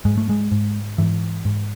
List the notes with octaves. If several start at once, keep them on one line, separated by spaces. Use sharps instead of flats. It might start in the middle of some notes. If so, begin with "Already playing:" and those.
G#2 G#3
A3
G#3
G#2
G#2 E3
G#2